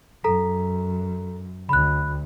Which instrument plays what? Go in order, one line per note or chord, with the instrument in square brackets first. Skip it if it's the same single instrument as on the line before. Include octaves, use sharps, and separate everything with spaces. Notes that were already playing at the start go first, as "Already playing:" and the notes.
[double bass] F#2 [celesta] A4 A#5 B6
[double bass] D2 [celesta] B5 F#6